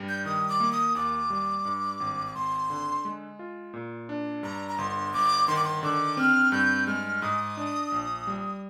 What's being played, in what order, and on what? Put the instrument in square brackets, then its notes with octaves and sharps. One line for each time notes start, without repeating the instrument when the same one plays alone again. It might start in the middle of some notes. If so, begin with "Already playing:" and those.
Already playing: [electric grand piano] G2 G3
[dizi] G6
[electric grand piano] D#3 [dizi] D#6
[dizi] D6
[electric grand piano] A#3
[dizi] D#6
[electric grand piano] D#2 [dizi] D6
[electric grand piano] G3
G2
G#1
[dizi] D6
[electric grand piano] G#1 [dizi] C6
[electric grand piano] D3
G#3
F4
A#2
D4
[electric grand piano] G2 [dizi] A#5
[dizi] A#5
[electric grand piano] G1 [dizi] C6
[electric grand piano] G1 [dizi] D6
[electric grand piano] D#3 [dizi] C6
[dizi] D6
C6
[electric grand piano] D3 [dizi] D6
[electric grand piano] C4 [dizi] F6
[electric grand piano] G2 [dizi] G6
[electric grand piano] G#3 [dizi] F6
[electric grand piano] G#2 [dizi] D#6
[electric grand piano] D4
A#1
G3